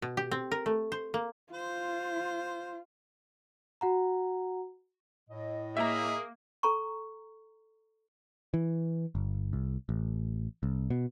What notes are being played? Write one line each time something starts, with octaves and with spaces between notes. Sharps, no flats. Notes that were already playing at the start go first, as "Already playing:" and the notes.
B2
G4
C4
A#4
A3
C5
A#3
F4 C5
F#4 F#5 A#5
A2 D#5
A#3 G#4 E5 A#5
A4 A#5 C#6
E3
G1
C2
A1
C2
B2